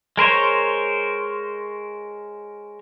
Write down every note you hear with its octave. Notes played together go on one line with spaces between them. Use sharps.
G#3 A#4 C5 C#5